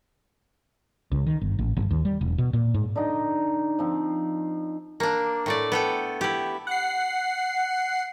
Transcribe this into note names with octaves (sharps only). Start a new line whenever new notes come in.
C#2
D#3
G1
A1
G1
D#2
G3
E1
B2
A#2
G#2
D3 D#4 G5
F3 C4
A#3 D4
A2 A3 D5
B3 A4 G5
E4 G4
F#5 C7